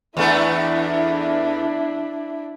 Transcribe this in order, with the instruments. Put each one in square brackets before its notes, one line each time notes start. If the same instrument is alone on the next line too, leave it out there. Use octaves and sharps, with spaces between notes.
[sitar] E2 A3 B3 [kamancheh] D4 E4